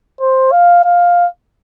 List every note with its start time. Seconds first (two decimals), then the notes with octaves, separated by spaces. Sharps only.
0.21 C5
0.52 F5
0.84 F5